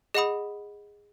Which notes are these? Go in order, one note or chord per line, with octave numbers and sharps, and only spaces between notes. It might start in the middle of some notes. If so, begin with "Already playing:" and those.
G#4 D#5 F#5 B5 D#6